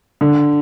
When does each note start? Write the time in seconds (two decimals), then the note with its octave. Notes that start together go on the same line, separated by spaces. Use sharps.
0.21 D3